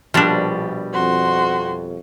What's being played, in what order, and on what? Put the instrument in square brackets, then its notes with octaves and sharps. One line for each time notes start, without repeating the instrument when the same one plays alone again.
[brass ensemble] A#1 [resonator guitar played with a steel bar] B2 G3 [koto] F3 D4
[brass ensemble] F2 [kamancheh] F#4 C6